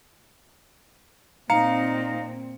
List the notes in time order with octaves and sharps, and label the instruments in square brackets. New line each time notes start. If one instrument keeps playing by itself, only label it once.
[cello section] A#2 C4 [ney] D#4 [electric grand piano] F5 C#7 [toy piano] A#5